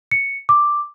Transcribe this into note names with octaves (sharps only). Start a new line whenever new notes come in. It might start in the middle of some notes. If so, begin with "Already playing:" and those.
C#7
D6